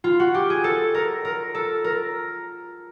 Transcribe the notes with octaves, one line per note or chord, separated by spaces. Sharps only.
F4
F#4
G4
G#4
A4
A#4
A#4
A4
A#4